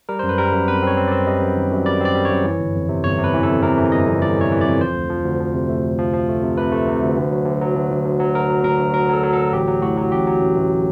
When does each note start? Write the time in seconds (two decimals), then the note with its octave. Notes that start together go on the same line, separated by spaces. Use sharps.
0.09 G3 A#4
0.19 F#2 C5
0.29 B4
0.38 G3 A#4
0.53 F#2
0.68 C4 B4
0.83 C4 C#5
0.97 C4
1.08 C4 D5
1.27 G3 D#5
1.41 F#2
1.56 D#3
1.71 F#2
1.86 G3 D5
2.01 C4 D5
2.15 G3
2.25 F#2 C#5
2.44 E3
2.59 G1
2.75 F2
2.89 C3
3.03 G1 C#5
3.18 C3
3.24 B4
3.33 E3
3.43 F2 A4
3.63 C3 A#4
3.77 E3
3.92 G1 D#5
4.07 F2
4.22 G1 D5
4.37 E3 C#5
4.52 E3
4.61 F2 D5
4.80 F3 C5
4.96 D2
5.10 F3
5.25 D2
5.40 F3
5.54 C3
5.69 A3
5.84 D2
5.99 F3
6.14 F3
6.29 A3
6.42 C3
6.57 C3 B4
6.72 A3
6.87 C3
7.02 D2
7.16 D2
7.31 F#3
7.46 D2
7.61 F#3
7.75 D2
7.91 D2
8.05 D2
8.20 F#3
8.35 D2 A#4
8.50 F#3
8.64 D2 A#4
8.79 D2
8.94 F#3 A#4
9.09 F#3 A4
9.24 F#3
9.33 D2 A4
9.52 A1 G4
9.67 F#3
9.82 A2 F#4
9.97 F#3
10.12 A1 G4
10.27 F#3
10.41 A1
10.56 A1